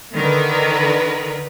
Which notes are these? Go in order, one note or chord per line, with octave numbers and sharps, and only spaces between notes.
D3 D#3 A#4 B4